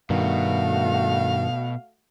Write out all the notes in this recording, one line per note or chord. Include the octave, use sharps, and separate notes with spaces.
G2 B2 D#3 A3 F#4 F5